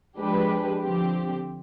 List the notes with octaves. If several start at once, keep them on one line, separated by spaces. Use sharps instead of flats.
F3 G#3 D4 G4 B4
D3 F3 C4 G4